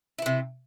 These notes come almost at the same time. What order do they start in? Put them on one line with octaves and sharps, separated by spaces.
E4 E3 C3